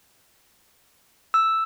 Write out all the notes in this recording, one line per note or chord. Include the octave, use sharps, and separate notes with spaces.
E6